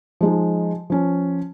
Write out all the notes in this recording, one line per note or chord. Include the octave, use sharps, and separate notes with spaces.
F3 G#3 D#4
F3 C#4